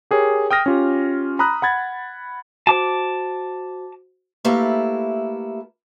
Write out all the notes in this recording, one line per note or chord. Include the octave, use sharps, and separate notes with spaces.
G4 G#4 A#4 C#5
G5 D#6 F6 A#6
C#4 F4 G4
A#5 B5 D#6 F#6
F#5 B5 G#6 A6
F#4 C5 A5 D6
A3 A#3 E4 G4 A4 B4